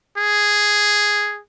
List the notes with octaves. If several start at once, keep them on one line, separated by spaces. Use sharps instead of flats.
G#4